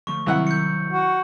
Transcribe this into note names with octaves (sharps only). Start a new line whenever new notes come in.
D3 F3 A3 C#6
C2 D#3 F#3 E4 F#5
G6 C#7
F#4